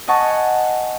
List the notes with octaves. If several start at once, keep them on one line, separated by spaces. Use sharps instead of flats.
D#5 F#5 G#5 A5 C#6